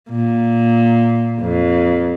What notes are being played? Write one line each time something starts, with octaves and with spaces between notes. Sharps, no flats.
A#2
F2